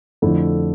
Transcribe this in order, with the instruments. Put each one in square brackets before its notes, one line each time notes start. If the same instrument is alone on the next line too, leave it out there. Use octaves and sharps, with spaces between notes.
[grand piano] F2 D3 A3 E4